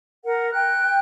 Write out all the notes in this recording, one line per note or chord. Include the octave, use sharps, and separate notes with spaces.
A#4 F#5
G5 F#6